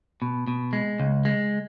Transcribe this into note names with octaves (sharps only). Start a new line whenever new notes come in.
B2
B2
G#3
C#2
G#3